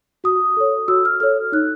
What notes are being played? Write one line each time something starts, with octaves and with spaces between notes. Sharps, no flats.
F#4 D#6
A4 C#5
F#4 E6
F6
A4 C#5 F6
D#4 F#6